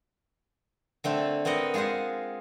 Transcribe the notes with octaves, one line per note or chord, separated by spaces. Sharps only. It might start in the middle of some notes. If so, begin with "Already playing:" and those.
D3 A3 C4
B3 C4 A#4 D#5 F#5
G#3 F4 G#4 C5 F#5